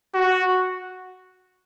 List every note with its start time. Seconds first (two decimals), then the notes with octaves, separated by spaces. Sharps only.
0.15 F#4